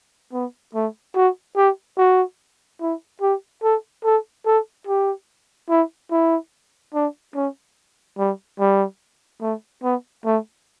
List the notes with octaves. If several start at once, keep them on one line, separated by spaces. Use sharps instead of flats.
B3
A3
F#4
G4
F#4
E4
G4
A4
A4
A4
G4
E4
E4
D4
C#4
G3
G3
A3
B3
A3